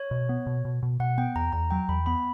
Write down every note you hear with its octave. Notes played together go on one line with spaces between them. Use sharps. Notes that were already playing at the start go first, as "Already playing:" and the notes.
Already playing: C#5
B2
B3
B2
B2
B2
B2 F#5
B3 G5
E2 A#5
E2 A#5
F#3 G5
E2 B5
B3 B5